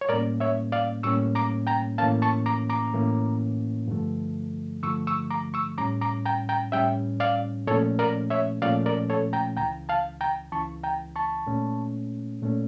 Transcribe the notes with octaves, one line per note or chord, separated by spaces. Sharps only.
C#5
A2 G3 A#3 C#4 A#4 D5
C#5 E5
D5 F5
A2 G3 A#3 C#4 C#6 E6
A#5 D6
G5 A#5
A2 E3 A#3 C#4 F5 A5
A5 C#6
A#5 D6
A#5 D6
A2 E3 A#3 C#4
G2 D3 F3 A3
G2 D3 F3 A3 C#6 E6
C#6 E6
A#5 D6
C#6 E6
A2 G3 C#4 A#5 D6
A#5 D6
G5 A#5
G5 A#5
A2 G3 C#4 E5 G5
D5 F5
A#2 F3 A3 C#4 A4 C#5
A#4 D5
C#5 E5
A#2 F3 A3 C#4 D5 F5
A#4 D5
A4 C#5
G5 A#5
C#2 C#3 E3 G5 A#5
F5 A5
G5 A#5
C#2 C#3 E3 A5 C#6
G5 A#5
A5 C#6
A#2 A3 C#4
A#2 A3 C#4